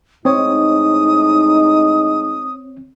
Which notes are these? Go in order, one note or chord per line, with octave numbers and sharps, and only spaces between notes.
A2 G#3 C4 D#4 C#5 D#6